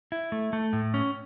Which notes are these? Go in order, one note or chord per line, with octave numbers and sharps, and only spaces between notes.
E4
A3
A3
A2
C#4